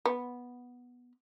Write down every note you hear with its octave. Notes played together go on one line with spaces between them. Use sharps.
B3